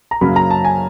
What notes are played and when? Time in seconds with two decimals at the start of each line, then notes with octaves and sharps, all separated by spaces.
0.11 A#5
0.21 F#2 C#3 F#3 A#3 C#4 B5
0.36 A#5
0.50 A5
0.65 G#5